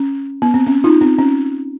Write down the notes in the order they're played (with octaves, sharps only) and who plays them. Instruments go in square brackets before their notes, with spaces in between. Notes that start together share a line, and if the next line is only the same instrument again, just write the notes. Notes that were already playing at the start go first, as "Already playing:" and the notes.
Already playing: [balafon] C#4
B3
C4
C#4
D#4 F4
C4
C#4